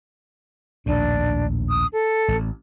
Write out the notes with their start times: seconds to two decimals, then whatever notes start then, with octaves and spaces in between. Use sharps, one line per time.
0.86 A#1 D#2 A2 D4
1.69 D#6
1.93 A4
2.28 A1